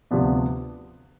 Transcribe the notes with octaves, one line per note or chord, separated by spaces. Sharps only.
D2 C3 F3 B3 D4